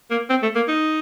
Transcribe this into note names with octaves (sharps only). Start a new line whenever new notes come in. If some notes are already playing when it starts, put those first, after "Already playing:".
A#3
C4
A3
A#3
D#4